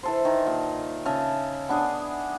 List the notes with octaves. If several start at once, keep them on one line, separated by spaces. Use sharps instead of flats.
E3 A4 C5
D#3
A#2
C#3 E5 A5
B3 D4 G#4